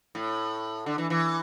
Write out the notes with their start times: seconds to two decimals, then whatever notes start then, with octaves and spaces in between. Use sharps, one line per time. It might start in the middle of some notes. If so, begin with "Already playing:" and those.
0.15 A2
0.86 D3
0.98 E3
1.10 E3